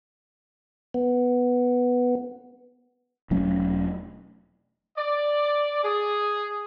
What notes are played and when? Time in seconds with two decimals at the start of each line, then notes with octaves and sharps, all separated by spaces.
0.94 B3
3.31 E1 F#3 A3 C#4
4.97 D5
5.83 G#4